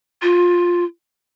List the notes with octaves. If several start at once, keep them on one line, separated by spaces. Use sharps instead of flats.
F4